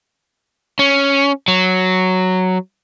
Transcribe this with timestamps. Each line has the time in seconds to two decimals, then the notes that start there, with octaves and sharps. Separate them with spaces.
0.79 C#4
1.48 F#3